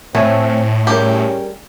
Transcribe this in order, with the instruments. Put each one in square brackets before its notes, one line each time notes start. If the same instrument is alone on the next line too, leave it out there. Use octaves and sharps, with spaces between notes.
[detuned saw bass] A2 [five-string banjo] A3 [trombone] C4 [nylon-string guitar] A4 C#5 G#5
[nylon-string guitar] G3 G#4 A#4 [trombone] C#4 [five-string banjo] G4